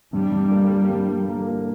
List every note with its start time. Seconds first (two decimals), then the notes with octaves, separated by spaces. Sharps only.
0.13 G2 G3
0.32 G2
0.52 A#3
0.71 A#3
0.90 G2
1.09 A#3
1.29 A#3
1.49 A#3